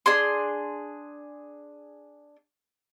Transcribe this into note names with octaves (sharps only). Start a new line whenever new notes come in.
D4 G#4 C6